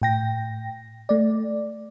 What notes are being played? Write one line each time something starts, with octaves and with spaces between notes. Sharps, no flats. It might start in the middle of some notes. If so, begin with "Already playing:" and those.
A2 G5 A#6
A3 D5